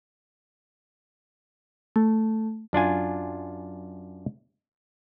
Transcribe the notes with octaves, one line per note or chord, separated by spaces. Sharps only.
A3
F#2 D4 F4 G#5